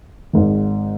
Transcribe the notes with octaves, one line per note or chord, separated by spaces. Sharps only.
G#1 G#2 D#3